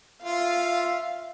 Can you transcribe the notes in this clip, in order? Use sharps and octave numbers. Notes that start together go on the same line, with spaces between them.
F4 E5 F5